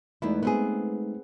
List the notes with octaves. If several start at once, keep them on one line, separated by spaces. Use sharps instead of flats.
E2 G#3 A3 B3 D#4 E4
B3 C4 G#4